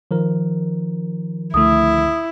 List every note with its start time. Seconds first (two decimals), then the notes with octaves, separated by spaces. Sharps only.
0.11 D#3 F3 A#4
1.54 C#2 D3 A3 E4 D#6